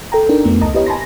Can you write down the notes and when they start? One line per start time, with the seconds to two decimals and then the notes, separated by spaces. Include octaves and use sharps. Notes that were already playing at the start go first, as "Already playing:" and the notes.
0.12 A4 G5 A#5
0.29 D4 D#4 A#4
0.45 F2 F3 A3 B3
0.61 C#2 D#5 A5 A#5 D#6
0.74 E4 G4 B4 C#5 D#5
0.86 G#5 A5 B5 C6 A#6